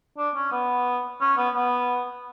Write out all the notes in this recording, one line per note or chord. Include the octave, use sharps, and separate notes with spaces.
D4
C#4
B3
C#4
B3
B3